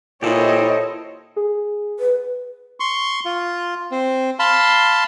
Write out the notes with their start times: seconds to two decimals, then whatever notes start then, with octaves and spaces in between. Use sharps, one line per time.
0.23 A#2 E4 G4 A4 C5 C#5 D#5
1.36 G#4
1.99 B4
2.80 C6 C#6
3.25 F4
3.92 C4
4.39 F5 A5 B5 C6